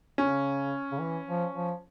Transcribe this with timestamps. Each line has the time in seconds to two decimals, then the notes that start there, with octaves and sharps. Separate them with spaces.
0.18 C#3 C#4
0.92 C#3
0.99 E3
1.27 F3
1.54 F3